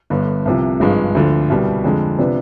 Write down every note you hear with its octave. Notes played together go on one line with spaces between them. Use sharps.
G1 G2 D3
C2 C3 F3
G#1 G2 F3 G#3
D2 D3 F3
C2 B2 G3
F2 D3 G#3
C3 F3 B3 D4